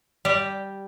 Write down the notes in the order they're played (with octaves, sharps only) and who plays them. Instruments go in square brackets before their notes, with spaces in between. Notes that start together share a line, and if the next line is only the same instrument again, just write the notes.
[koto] G3 G4